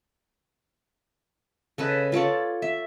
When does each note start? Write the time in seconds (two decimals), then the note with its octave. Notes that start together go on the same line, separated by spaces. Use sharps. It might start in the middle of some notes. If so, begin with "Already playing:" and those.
1.78 C#3 A4 B4 D#5
2.12 F4 A4 C#5 D5
2.62 E5